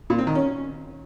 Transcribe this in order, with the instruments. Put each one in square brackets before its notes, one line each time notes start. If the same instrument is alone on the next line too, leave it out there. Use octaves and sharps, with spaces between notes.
[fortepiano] A#2
C4
D#3
C#4